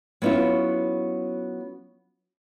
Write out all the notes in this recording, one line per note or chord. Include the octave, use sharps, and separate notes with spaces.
F#3 B3 C#4 E4 F4